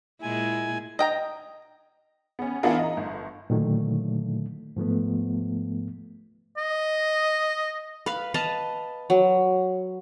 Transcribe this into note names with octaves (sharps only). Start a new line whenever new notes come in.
A#2 G#3 E4 G#5
D#5 G5 A#5
B3 C#4
E3 B3 D4 E4 F4 A#4
D#5 A#5
G1
A#2 D3 D#3 F#3 A3
G#2 F3 A3 B3
D#5
B4 F5
B4 D#5 F5 A5
F#3